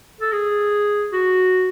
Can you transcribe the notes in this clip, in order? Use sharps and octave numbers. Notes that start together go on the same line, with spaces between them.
A4
G#4
F#4